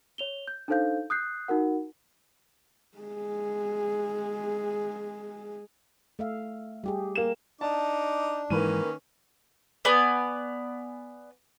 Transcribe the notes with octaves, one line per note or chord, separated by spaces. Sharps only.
C#5 F7 G7
G6
D4 D#4 A4 C5 F5 G6
D#6 F#6 G6 C7
D#4 F#4 A#4 F#5
G#3 G#4
A3 E5 F5
G3 G4 G#4
A#3 E7
D4 D#4 A5 D6
G#2 D#3 E3 A#3 C#4 B4 D#7
B3 D5 G#5